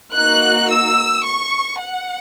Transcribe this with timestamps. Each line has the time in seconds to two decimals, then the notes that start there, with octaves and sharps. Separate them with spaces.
0.15 A#3 D#4 F#4 F#6
0.70 E6
1.26 C#6
1.81 F#5